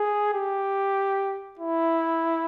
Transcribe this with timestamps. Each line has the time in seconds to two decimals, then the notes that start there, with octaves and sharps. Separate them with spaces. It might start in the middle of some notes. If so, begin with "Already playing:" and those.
Already playing: G#4
0.34 G4
1.59 E4